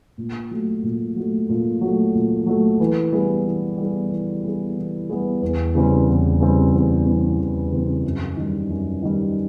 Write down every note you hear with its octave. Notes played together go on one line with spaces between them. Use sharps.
A#2
F#3 A3
A#2
F#3 A3
A#2
F#3 A3
A#2
F#3 A3
E3
G3 B3 E4 G#4
E3
G3 B3 E4 G#4
E3
G3 B3 E4 G#4
E3
G3 B3 E4 G#4
E2
C#3 E3 G3 C4
E2
C#3 E3 G3 C4
E2
C#3 E3 G3 C4
E2
C#3 E3 G3 C4
F#2
D#3 G3
F#2
D#3 G3